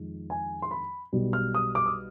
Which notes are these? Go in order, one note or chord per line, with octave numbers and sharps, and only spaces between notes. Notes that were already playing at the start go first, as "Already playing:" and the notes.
Already playing: F2 D#3 G#3
G#5
C6
B5
B1 B2 G3
F6
D#6
D6
D#6